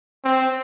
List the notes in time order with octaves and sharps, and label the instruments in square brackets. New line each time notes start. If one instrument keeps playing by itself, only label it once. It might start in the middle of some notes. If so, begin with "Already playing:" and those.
[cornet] C4